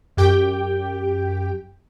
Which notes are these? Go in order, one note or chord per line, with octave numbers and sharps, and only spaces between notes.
F#2 G4 G5